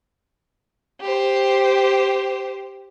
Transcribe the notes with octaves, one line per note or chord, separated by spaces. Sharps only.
G4 C5